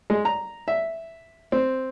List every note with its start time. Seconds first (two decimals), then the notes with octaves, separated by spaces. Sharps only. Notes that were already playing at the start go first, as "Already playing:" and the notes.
0.10 G#3
0.25 A#5
0.68 E5
1.52 C4